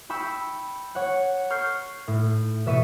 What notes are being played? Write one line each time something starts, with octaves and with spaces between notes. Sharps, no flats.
G5 B5 C#6 E6 G6
C#5 F#5
C#6 F6 G6 G#6 C7
A2
E2 B2 E5 C#6 C#7 D#7